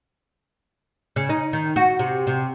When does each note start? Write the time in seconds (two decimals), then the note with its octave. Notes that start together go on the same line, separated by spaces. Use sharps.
1.16 C#3
1.29 D#4
1.53 D#3
1.76 F#4
1.99 C3
2.27 C3